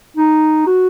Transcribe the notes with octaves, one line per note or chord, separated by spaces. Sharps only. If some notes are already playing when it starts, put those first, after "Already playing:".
D#4
F#4